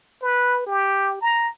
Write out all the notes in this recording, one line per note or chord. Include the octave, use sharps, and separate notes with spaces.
B4
G4
A#5